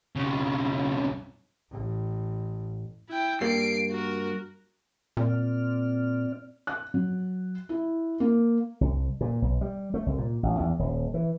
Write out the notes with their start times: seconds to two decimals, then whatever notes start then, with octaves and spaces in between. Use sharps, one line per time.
0.16 B1 C#3
1.71 A1
3.09 E4 G5
3.41 G2 G3 A#3 C7 D7
3.91 F#4 A#4
5.17 A#2 C4 D5 F6
6.67 F#6
6.94 F#3
7.69 E4
8.20 A#3
8.81 C2
9.21 A#2
9.42 B1
9.61 G3
9.94 A3
10.06 C2
10.18 A#2
10.43 A1
10.60 E2
10.79 D#1
11.14 E3